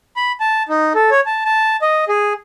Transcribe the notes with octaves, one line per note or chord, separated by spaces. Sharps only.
B5
A5
D#4
A4
C#5
A5
A5
D#5
G#4